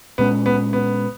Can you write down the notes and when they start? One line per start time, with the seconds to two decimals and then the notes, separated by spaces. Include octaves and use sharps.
0.18 A#2 G#3 B3 C#4
0.46 B3
0.73 B3